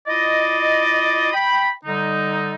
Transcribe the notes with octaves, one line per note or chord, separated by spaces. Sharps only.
E4 F4 D5 D#5
G5 B5
D3 G3 D#4